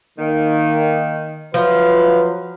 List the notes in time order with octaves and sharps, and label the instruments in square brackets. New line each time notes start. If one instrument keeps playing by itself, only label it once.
[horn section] D#3 [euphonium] A#3
[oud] F3 [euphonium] F#3 [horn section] F4 E5 F5 [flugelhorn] B4